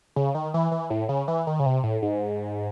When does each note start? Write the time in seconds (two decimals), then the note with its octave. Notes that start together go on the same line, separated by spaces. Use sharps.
0.16 C#3
0.35 D#3
0.54 E3
0.72 E3
0.90 A2
1.09 C#3
1.28 E3
1.47 D#3
1.60 C#3
1.66 C3
1.83 A2
2.02 G#2